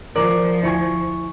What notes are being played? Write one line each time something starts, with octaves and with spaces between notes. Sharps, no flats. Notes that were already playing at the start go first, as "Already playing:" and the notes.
F3 A#4 D5
D2 E4 G#5 C#6 C#7